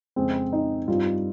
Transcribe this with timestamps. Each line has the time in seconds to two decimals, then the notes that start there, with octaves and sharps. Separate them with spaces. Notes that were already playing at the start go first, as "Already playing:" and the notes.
0.16 F2 C#3 G#3 C4
0.53 D#4
0.88 G2 G3 C4 D#4 F4